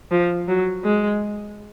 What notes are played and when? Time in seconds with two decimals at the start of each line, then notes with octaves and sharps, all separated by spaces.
0.11 F3
0.48 F#3
0.84 G#3